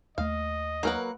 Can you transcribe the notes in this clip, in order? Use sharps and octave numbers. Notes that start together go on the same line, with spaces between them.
D#2 A3 D#5 F5
F#3 A#3 A#4 B4 F#5